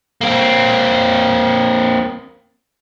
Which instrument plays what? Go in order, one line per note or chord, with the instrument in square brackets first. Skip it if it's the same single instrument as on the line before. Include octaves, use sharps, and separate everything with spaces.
[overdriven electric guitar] A#3 C4